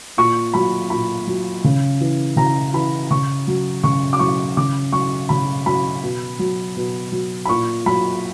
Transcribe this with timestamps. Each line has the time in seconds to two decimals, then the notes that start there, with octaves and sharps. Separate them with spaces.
0.18 A#2 C#6
0.54 F#3 B5
0.90 A#2 B5
1.27 F#3
1.64 C#3
2.01 E3
2.36 C#3 A#5
2.74 E3 B5
3.10 C#3 C#6
3.47 F#3
3.83 C#3 C#6
4.13 D6
4.19 F#3 C#6
4.57 C#3 D6
4.92 F#3 C#6
5.29 C#3 B5
5.66 F#3 B5
6.03 B2
6.39 F#3
6.77 B2
7.12 F#3
7.45 B5
7.49 A#2 C#6
7.86 F#3 B5